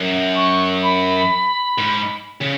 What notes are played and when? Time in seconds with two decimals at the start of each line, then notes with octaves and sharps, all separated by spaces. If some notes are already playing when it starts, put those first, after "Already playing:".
Already playing: F#2
0.35 C#6
0.83 B5
1.78 G#2
2.41 C#3